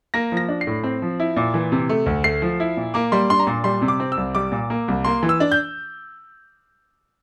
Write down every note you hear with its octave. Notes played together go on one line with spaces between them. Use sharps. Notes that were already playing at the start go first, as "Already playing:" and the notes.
A#3 A#6
F3
A#6
D4
C7
A2
C4
F3
E4
A#2
E3
C3
A3
D2
A3 C7
F3
E4
A#2
A#3 D6
G3 C6
D4 C6
A#5
A#2 C6
G3 C6
C3
D6
C4
E6
C2
G3 D6
A#2
A#3
C2
A#3 C6
E3
E6
D4
G6